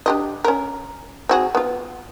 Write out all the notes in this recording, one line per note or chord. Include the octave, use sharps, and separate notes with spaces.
D4 G4 D#5
C#4 A#4
C4 F#4 G#4
B3 F4